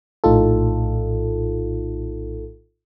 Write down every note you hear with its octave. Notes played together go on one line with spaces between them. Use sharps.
A#1 A2 D#4 F4 A4